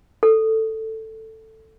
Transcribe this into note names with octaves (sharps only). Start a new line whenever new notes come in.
A4